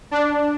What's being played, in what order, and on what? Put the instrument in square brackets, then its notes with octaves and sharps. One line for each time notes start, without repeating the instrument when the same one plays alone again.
[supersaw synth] D4